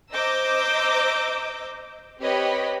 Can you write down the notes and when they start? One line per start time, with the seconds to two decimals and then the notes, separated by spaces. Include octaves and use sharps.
0.12 C5 D#5 A#5 D6 E6 G6
2.21 C4 G4 B4 C#5 D#5 B5